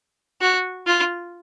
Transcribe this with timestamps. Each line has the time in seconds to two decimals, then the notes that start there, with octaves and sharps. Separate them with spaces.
0.41 F#4
0.87 F4